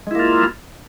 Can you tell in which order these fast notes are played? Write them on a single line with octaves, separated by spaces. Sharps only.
G#3 E4 A#3 F4